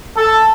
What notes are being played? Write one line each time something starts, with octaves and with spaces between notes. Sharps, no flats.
A4